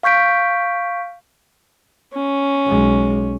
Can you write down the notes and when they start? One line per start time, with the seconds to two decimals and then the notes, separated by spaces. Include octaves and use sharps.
0.03 F5 C#6 G6 B6 D7
2.15 C#4
2.65 B1 G#3